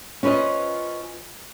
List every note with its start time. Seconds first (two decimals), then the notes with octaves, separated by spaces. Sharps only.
0.23 C#4 F4 B4 C5 D#5